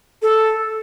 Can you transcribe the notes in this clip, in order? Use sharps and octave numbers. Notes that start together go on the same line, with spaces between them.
A4